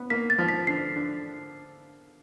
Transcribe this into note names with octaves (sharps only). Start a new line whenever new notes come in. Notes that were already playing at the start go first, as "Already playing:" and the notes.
Already playing: B3
A#3 B6
A6
F3
B6
D3 C7
D3